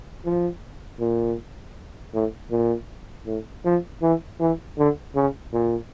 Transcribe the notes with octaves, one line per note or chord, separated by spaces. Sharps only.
F3
A#2
A2
A#2
A2
F3
E3
E3
D3
C#3
A#2